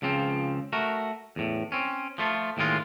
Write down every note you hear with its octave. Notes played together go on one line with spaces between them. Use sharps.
C#2 C#3 F3 C4
A3 F#4 A#4
E2 A2
C4 C#4
F3 A3 F4
D#2 A2 D#3 G#3 F4